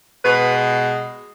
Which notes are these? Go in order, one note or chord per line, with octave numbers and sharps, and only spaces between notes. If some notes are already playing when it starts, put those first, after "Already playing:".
B2 G#3 B4